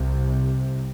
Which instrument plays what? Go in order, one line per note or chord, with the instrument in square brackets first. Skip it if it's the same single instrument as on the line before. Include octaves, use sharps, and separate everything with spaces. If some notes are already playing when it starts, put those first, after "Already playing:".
Already playing: [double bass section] C2 C3